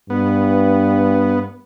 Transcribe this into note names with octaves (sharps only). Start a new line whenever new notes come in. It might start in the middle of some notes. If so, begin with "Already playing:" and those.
G2 B3